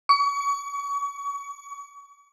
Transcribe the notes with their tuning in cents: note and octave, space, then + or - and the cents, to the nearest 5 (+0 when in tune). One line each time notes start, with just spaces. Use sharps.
C#6 +35